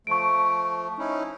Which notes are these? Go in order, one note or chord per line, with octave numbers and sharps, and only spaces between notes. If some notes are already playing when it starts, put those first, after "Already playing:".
F3 A3 C#6 D7
C#4 D#4 E4